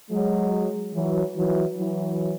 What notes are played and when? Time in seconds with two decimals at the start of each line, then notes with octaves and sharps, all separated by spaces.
0.10 F#3 G#3
0.93 E3 F#3
1.35 E3 F#3
1.77 E3 F#3